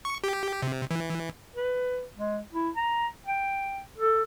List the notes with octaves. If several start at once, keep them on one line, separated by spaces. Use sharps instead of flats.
C#6
G4
C3
E3
B4
G#3
E4
A#5
G5
A4